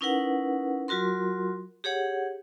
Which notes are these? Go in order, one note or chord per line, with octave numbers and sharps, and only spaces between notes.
C#4 D#4 E4 A#4 B4 F#5
F#3 F4 F#4 A#4 C6
G4 G#4 C#5 F#5